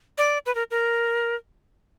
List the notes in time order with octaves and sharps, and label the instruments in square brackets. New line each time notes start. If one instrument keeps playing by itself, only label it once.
[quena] D5
B4
A#4
A#4